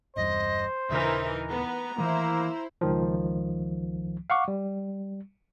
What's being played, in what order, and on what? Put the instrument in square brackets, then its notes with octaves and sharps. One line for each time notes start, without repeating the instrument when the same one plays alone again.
[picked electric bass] G1 E2 G2 [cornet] C5 [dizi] D#5
[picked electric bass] D#1 C#3 D4 [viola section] E3 D#4 A#4 [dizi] E5
[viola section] B3 [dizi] A#5
[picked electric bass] D#3 E3 A3 [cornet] A#3 [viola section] E4 C5
[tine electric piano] C#2 D#3 F3
F5 F#5 C#6 D6
G3